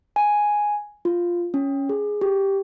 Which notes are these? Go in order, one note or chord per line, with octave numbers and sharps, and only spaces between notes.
G#5
F4
C#4
G#4
G4